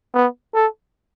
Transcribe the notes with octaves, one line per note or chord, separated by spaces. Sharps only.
B3
A4